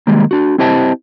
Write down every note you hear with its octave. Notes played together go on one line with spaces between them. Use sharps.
D#3 G3 G#3 A#3
D4 F#4
C4 E4 G4 C5 D#5 A5